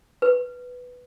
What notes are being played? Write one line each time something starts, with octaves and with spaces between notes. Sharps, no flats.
B4